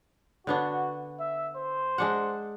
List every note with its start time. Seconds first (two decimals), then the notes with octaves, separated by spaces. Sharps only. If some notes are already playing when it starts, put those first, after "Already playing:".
0.47 D3 B3 D4 F#4
1.20 E5
1.57 C5
1.98 G#3 D4 F#5